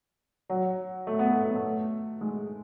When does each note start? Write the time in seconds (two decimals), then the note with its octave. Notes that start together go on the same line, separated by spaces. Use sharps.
0.50 F#3
1.07 A3
1.19 B3
1.31 A3
1.43 B3
1.55 A3
2.21 G#3